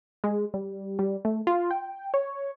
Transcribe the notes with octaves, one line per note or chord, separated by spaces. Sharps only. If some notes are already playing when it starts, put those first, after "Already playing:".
G#3
G3
G3
A3
F4
G5
C#5